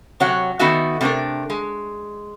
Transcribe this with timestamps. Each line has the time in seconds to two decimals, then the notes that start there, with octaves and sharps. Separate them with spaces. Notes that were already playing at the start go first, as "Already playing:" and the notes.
0.20 C3 F#3 C#5 F#5
0.59 D#3 A3 B3 D#4 F#4 E5
1.01 C3 A3 D4 A#4
1.50 G#3